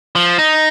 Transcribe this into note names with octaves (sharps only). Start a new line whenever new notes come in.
F3
D#4